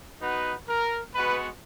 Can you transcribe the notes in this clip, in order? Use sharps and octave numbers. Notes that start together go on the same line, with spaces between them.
B3 D#4 F#4 B4
A#4
G#3 B3 F#4 B4